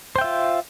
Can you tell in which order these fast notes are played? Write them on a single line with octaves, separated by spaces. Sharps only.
C5 G5 E5 F4